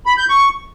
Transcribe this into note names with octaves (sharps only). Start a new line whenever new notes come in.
B5
G6
C#6